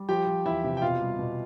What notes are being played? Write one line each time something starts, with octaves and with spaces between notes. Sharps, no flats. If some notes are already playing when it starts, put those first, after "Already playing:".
Already playing: G3
F3 G4 G5
F3
E2 E4 E5
C3
G5
B2 F4 F5
G3
B2